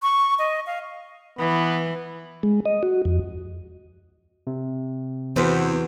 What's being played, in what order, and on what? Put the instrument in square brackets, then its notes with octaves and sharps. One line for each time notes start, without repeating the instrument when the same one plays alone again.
[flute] C#6
D#5
F5
[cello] E3 [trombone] B3
[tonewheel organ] G#3
D#5
F#4
F2
[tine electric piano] C3
[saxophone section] E2 [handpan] E3 F#4 [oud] C4 B4